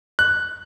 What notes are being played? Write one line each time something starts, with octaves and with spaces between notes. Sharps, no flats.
F#6